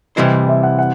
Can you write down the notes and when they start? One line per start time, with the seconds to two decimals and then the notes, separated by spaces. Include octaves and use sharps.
0.16 C3 E3 G3 C4 E4 D#5
0.48 E5
0.63 F#5
0.79 F#5